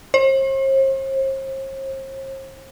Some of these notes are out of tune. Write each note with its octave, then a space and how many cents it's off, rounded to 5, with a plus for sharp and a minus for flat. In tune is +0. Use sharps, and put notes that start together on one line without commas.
C5 +45